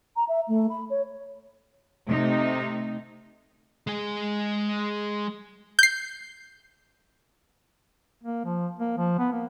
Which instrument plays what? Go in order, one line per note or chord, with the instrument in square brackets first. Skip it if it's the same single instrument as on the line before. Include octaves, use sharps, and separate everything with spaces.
[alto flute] A#5
E5
A3
B5
C#5
[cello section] C3 A3 D#4
[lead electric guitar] G#3 G#4
[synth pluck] G6 C7
[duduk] A#3
F3
A#3
F3
B3
A#3